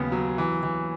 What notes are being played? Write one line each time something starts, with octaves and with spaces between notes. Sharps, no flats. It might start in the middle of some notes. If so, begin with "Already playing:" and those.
Already playing: D#2 C#3 F#3 B3
F#3
E3
E3